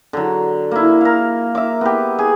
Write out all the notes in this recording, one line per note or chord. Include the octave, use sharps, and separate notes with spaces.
D3 F#3
A#3 E4
A#4 F5
E5 D6
B3 G4
G#4